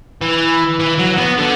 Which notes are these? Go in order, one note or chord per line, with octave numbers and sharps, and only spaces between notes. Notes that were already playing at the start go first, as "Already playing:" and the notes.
E3
E3
F#3
B3
D3